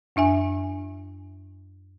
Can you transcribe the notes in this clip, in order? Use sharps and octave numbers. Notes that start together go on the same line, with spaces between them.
F#2 D4 E5 G#5